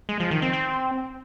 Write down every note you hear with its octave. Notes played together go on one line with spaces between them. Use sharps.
G#3
F3
D#3
C4
C4